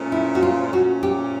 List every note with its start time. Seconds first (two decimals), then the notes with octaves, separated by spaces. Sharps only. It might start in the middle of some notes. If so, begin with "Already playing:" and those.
Already playing: A#2 F3 A3 C#4
0.12 E4
0.35 F#4
0.43 F4
0.73 A#2 F3 A3 C#4 F#4
1.03 G4